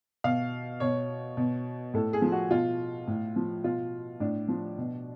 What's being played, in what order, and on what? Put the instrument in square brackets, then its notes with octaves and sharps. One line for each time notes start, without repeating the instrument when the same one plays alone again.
[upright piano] B2 F5
B2 C#5
B2
A2 A4
G#4
F3
F#4
B2 F4
A2
F3
B2 F4
A2 D4
F3
B2